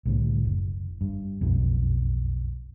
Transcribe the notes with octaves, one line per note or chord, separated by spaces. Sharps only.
C2 A2 D3
F#1
G2
F#1 B1 F2